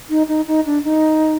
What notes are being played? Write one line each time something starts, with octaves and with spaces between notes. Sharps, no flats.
D#4
D#4
D#4
D4
D#4